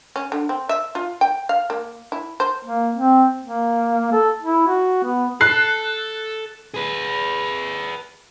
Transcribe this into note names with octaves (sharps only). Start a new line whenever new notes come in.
C#4
D3
C4
E5
F4
G5
F5
A#3
E4
C5
A#3
C4
A#3
A4
E4
F#4
B3
A4 F#6 C7
G#4 B4